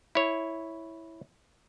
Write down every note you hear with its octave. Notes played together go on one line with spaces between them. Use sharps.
E4 C#5